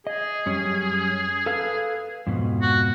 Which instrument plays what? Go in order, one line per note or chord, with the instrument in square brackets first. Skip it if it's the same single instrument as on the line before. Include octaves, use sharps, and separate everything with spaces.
[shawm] G#4 [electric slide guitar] D#5
[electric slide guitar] F#2 G3 C#4
A4 B4 F5
F2 G#2 B2
[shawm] F#4